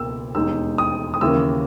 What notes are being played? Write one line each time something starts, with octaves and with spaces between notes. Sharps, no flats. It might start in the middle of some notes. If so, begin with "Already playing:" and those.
Already playing: C#2 B2 A#3 E6
E1 D#2 D#3 G#3 D#4 E6
D#6
D#6
D#2 C#3 E3 A#3 E6